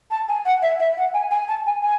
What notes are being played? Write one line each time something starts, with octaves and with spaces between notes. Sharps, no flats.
A5
G#5
F#5
E5
E5
F#5
G#5
G#5
A5
G#5
G#5